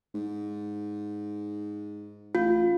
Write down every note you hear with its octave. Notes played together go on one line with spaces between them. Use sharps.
G#2
A1 F4